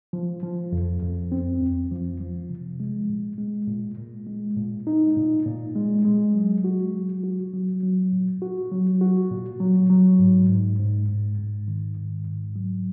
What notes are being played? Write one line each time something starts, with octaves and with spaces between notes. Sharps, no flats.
F3
F3
F2
F2
C4
F2
F3
F3
C3
G#3
A#2
G#3
A#2
A#2
G#3
A#2
D#4
A#2
A#2
G#3
G#3
F#3
F#4
F#3
F#4
F#3
F#3
A#2
F#4
F#3
F#4
A#2
F#3
F#3
G#2
G#2
G#2
G#2
G#2
D#3
G#2
G#2
F#3